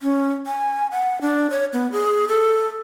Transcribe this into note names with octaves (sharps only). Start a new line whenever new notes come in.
C#4
G#5
F#5
D4
C#5
B3
G#4
A4